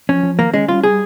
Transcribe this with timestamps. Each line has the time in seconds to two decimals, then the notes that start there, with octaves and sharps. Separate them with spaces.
0.09 F3 C#4
0.23 F3
0.39 D#3 A#3
0.53 G#3 C#4
0.68 G3 F4
0.84 G3 G#4